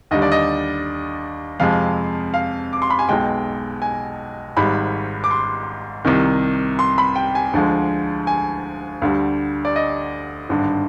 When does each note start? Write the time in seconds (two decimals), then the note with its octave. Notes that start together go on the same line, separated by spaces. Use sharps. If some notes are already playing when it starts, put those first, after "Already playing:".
0.11 D#2 D3 G3 D#5
0.22 D5
0.32 D#5
1.60 F2 C3 F3 G#3 F5
2.34 F5
2.73 D6
2.82 C6
2.90 B5
2.99 G#5
3.09 B1 B2 G#3 G5
3.82 G#5
4.57 G#1 G#2 G3 B5
5.24 D6
5.31 C6
6.05 C2 C3 D#3
6.79 C6
6.98 B5
7.16 G5
7.35 G#5
7.53 D2 D3 F3 G#3
8.27 G#5
9.02 D2 D3 G3 F5
9.65 D5
9.76 D#5
10.49 G#1 G2 D3